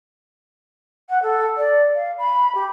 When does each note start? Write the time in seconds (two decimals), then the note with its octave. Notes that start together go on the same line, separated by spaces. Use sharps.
1.09 F#5
1.22 A4
1.57 D5
1.95 F5
2.18 B5
2.54 G4